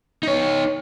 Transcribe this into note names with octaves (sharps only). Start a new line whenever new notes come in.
D#4 C#5